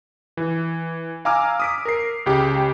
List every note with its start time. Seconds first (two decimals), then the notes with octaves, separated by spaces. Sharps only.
0.37 E3
1.25 F5 G#5 A#5 D6 E6 F6
1.60 D#6 B6 D7
1.85 A#4 C7
2.26 C#2 C#3 G4